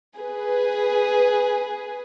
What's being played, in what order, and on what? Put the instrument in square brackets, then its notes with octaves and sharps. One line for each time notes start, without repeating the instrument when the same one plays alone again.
[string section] G#4 B4